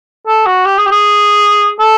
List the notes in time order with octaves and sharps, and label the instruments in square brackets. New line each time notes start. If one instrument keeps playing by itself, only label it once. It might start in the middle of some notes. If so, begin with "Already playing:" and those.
[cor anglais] A4
F#4
G4
G#4
G4
G#4
A4